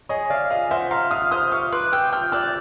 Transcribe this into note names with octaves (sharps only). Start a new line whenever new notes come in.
G#4 C#5 D#5
D5 E5 F5
G#4 D#5 F5
C5 E5 F#5
F5 A#5 C6
F5 D#6 F6
C5 D#6 F6
F5 C#6 D#6
B4 C6 D6
G5 D6 E6
G5 F6 G6
D5 E6 F#6